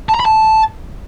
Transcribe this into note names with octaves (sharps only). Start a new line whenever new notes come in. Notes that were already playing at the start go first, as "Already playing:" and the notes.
A5
A#5
B5
A5